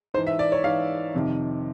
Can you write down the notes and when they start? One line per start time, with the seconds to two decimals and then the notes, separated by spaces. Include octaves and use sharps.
0.14 G#2 C5
0.18 E3
0.27 E5
0.39 D5
0.52 C#5
0.64 G#2 E3 F5
1.14 F2 C3 D#3